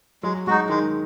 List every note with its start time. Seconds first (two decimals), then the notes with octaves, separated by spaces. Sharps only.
0.23 F#3 G#3
0.47 G#3 D#4 F#4
0.69 D#3 G#3